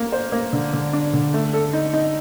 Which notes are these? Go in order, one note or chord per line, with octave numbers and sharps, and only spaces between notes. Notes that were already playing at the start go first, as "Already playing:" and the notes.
Already playing: A#3
C5
A#3
D3
D3
D4
D3
A3
A4
D#4
D#4